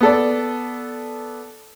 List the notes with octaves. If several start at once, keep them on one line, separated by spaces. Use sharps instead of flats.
B3 A4 D5